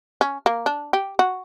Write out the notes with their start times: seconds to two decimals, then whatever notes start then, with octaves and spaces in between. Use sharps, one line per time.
0.21 C#4
0.46 A#3
0.66 D4
0.93 G4
1.19 F#4